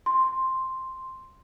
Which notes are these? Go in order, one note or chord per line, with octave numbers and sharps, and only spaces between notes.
C6